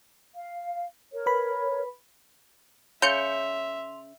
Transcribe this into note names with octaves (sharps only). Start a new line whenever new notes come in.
F5
A#4 C#5
B4 B5
C#3 E5 C6 G6 C#7 F7